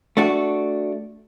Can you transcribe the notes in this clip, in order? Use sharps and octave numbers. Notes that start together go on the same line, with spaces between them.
A3 D4 F#4